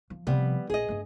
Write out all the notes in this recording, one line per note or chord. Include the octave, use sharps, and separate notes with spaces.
F3
C3 F3 G3 B3
A#1 G#4 D#5
G2 A3